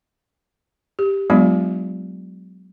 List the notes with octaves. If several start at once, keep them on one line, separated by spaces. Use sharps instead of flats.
G4
F#3 G#3 B3 D4 F4 D5